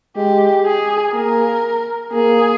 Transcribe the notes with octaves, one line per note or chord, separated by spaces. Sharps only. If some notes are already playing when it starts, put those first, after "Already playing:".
G#3 G4
G#4
A#3 A#4
A#3 G#4